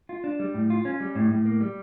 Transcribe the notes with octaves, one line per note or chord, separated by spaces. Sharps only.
F4
D4
G3
A2
F4
C#4
G3
A2
A2
A#3
G3